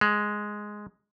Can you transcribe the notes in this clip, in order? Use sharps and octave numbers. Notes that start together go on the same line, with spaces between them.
G#3